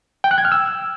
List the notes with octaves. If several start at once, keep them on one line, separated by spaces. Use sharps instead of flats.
G5
F#6
G#6
F6
E6